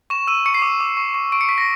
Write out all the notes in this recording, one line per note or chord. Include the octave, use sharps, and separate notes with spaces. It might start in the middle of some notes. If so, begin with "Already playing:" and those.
C#6 E7
E6 D#7
C#6 C#7
C7
D6
D6
C#6
C#6
C#6 D7
C#7
C#6 B6
A#6